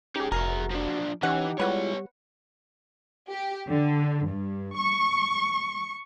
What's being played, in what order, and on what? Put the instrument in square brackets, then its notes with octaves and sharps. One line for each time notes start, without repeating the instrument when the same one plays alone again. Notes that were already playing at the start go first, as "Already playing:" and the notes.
[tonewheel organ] C#4 [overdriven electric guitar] D#4 G#4 [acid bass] G4
[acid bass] F1 [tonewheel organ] F#4 [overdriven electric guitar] G#4 E5 [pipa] A#4
[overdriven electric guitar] F3 D4
[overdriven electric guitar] E3 [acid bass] C#4 [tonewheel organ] D#4 G4 [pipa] F#5
[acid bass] G3 [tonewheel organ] G#3 E4 F4 [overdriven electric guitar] B3 C#5 [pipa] B4 F#5
[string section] G4
D3
G2
C#6